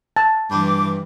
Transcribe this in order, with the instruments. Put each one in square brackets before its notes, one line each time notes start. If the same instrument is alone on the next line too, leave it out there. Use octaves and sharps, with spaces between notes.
[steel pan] A5
[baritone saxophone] G2 [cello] E3 [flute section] D6